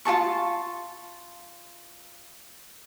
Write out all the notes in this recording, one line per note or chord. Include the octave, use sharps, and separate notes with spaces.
F4 G#4 A5 C#6